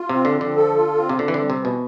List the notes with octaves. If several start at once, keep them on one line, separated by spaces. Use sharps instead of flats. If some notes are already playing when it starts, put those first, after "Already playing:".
Already playing: F4
C3
C4
D3
F3
D3
A4
F4
C4
C3
D3 C4
E3
D3
G3
C3
B2 E3